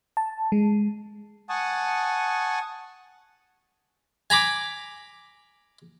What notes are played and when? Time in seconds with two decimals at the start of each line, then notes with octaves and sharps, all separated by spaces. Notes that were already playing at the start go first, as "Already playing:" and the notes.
0.17 A5
0.52 G#3
1.49 F#5 G#5 A5 C#6 D#6
4.30 G#5 A#5 B5 D6